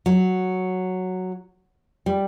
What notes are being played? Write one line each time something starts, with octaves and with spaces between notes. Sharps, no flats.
F#3
G3